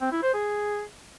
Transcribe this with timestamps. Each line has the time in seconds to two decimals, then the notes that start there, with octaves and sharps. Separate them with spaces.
0.01 C4
0.12 E4
0.23 C5
0.34 G#4